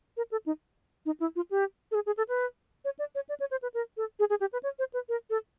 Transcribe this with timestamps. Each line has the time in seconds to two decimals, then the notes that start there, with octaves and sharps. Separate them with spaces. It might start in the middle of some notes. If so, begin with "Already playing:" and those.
0.17 A#4
0.32 A4
0.46 D#4
1.06 D#4
1.20 E4
1.36 F4
1.51 G4
1.92 A4
1.95 G#4
2.06 G#4
2.17 A4
2.29 B4
2.85 C#5
2.99 D5
3.15 C#5
3.29 D5
3.40 C#5
3.51 C5
3.62 B4
3.74 A#4
3.97 A4
4.19 G#4
4.30 G#4
4.41 G4
4.53 B4
4.63 C#5
4.79 C5
4.94 B4
5.09 A#4
5.30 A4